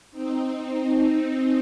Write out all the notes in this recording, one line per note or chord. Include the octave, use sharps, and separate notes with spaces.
C4 D#4